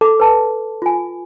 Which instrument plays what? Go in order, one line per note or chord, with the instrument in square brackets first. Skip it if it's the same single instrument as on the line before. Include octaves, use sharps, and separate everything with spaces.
[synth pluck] A4 [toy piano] D6
[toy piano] B4 A5
F4 G#5